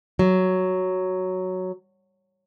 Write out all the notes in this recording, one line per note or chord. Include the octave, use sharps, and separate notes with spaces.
F#3